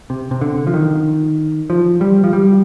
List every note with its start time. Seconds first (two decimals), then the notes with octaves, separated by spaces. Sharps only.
0.10 C3
0.31 C3
0.41 D3
0.67 F3
0.74 D#3
1.70 F3
2.01 G3
2.24 F3
2.33 G3